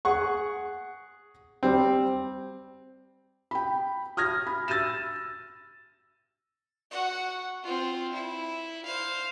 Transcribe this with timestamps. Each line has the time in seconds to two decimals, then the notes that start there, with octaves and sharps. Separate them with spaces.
0.05 G#4 F#5 C#6
1.63 G3 C4
3.51 G5 B5
4.17 D#6 F6 G#6 A#6
4.47 B5
4.68 E6 A6 A#6 D#7 E7
6.91 F#4 F#5
7.64 C4 F4
8.13 E4
8.86 C5 F5